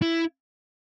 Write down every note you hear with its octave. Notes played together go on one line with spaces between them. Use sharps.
E4